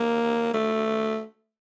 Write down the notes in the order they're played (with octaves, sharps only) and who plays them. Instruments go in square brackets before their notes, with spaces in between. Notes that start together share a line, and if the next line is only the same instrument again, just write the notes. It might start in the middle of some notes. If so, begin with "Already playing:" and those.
Already playing: [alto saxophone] A#3
A3